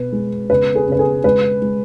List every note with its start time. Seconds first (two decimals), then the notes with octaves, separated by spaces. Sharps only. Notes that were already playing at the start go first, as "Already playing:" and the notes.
Already playing: B2 B4
0.12 G#3
0.50 C#3 B4
0.75 G#4
0.87 C#3 B4
0.99 G#4
1.24 G#3 B4
1.62 G#3